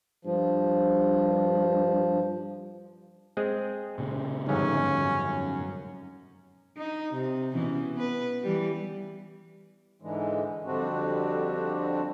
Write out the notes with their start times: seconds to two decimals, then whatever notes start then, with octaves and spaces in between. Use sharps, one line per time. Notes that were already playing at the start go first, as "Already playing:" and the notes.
0.25 G2 F3
3.37 G#3 C4 G#4
3.98 A#2 C#3
4.49 G1 F2 G#2 C#4
4.90 F#2
6.77 D#4
7.13 C3
7.51 B2 E3 C#4
7.94 B3 B4
8.43 E3 G3
10.02 G#2 D3 E3 G#3
10.65 F2 D3 G3 C4 D4 F#4